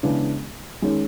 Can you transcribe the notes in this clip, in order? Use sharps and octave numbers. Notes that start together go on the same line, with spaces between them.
C#3 E3 G#3 B3 D4
D#3 G#3 C#4